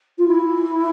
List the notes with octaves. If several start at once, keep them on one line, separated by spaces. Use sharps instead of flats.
F4
E4